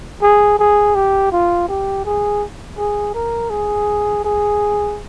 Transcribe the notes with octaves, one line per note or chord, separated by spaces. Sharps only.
G#4
G#4
G4
F4
G4
G#4
G#4
A#4
G#4
G#4